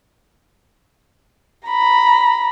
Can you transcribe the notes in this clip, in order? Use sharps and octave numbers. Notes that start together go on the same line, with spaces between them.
A#5 B5